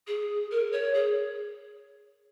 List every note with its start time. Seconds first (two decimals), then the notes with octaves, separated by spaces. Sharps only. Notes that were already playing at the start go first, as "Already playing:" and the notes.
0.07 G#4
0.51 A#4
0.72 C#5
0.94 G#4